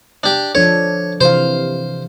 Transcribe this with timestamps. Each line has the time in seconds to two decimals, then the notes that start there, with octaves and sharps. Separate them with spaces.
0.23 D4 G4
0.55 F3 D4 A4 C#5
1.21 C3 E3 C5 F5